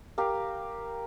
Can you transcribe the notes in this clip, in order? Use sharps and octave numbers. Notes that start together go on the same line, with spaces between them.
G4 A#4 F5